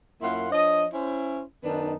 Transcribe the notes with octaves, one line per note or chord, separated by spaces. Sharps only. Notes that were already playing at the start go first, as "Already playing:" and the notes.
F#2 A#3 E4 F4 F#5 C6
F3 D4 C#5 D#5
C#4 E4 C5
F#2 D#3 B3 D4 D#4 A5